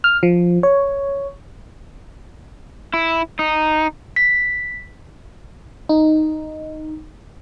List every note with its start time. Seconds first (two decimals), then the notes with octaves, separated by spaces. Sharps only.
0.04 F6
0.23 F3
0.63 C#5
2.94 E4
3.39 D#4
4.16 B6
5.89 D#4